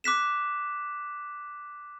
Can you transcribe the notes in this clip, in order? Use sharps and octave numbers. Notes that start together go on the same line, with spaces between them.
D6 F#6 B6 E7